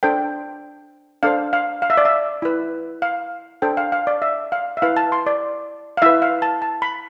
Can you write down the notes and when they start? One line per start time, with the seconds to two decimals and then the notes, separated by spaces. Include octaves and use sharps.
0.03 D4 A4 C5 G5
1.23 D4 A4 C5 F5
1.53 F5
1.82 F5
1.90 E5
1.97 D5
2.05 E5
2.42 E4 B4
3.02 F5
3.62 D4 A4 C5 G5
3.77 F5
3.92 F5
4.07 D5
4.22 E5
4.52 F5
4.77 E5
4.82 E4 B4 F5
4.97 A5
5.12 C6
5.27 D5
5.97 F5
6.02 E4 B4 E5
6.22 F5
6.42 A5
6.62 A5
6.82 B5